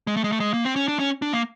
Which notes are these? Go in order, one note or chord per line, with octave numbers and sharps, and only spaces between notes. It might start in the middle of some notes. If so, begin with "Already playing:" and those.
G#3
A3
G#3
A3
G#3
A#3
C4
C#4
D4
C#4
D4
A#3